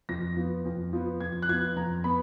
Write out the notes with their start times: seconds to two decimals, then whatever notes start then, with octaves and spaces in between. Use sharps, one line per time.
0.09 F2 A#6
0.37 F3 B3
0.65 F2
0.93 F3 B3
1.20 F2 G#6
1.42 F#6
1.49 F3 B3 G#6
1.76 F2 A#5
2.04 B3 B5